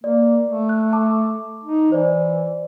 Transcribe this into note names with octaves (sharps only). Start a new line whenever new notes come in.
A#3 D5
A3
F#6
A5 D6
D#4
E3 C5 D5